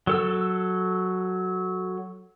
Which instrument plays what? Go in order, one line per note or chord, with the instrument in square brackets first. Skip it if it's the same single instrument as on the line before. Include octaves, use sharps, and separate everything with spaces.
[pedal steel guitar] F#3 A4 E6